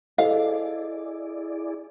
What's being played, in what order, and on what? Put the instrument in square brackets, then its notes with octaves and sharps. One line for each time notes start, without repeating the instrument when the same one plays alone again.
[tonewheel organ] E4 G#4 D5 [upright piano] A4 C5 [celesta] D#5 [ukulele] F5